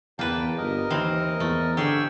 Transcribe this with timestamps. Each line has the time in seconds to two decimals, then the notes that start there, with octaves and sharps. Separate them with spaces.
0.19 E2 A#3 B4 G5 A5
0.58 G1 A#4 D#5
0.90 D#2 E3 C4
1.40 E2 A3
1.77 D3 G4 G#4 C#6 E6